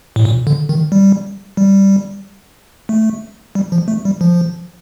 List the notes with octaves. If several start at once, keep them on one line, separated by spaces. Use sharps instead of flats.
A2
A#2
D3
D#3
G3
G3
A3
G3
F3
A3
G3
F3